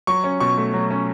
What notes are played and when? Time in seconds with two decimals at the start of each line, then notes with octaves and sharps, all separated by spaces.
0.07 F#3 C#6
0.24 C#4
0.40 B2 C#6
0.57 A3
0.74 F#3
0.91 C#4